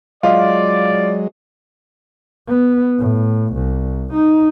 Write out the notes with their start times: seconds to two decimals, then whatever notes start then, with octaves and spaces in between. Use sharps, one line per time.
0.23 F#3 G#3 F4 D5 D#5 F5
2.48 B3
2.98 A2
3.54 C2
4.13 D#4